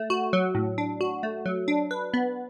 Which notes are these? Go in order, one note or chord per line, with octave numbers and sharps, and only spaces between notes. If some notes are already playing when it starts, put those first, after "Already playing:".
Already playing: A3
F#4
F#3
A2
D4
F#4
A3
F#3
D4
B4
B3